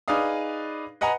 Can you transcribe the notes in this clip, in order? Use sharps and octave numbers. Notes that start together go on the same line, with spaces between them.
D#4 G#4 B4 D5 F5 D#6
B4 D#5 F#5 G#5 A#5